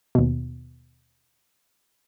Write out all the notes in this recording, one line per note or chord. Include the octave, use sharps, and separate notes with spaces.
D#2 B2